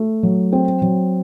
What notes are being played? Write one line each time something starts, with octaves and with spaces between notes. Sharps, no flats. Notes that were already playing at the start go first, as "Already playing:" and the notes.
Already playing: A3
F#3
C4
F#3